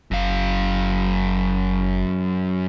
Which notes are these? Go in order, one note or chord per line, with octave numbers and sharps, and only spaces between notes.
F#1 F#2 F5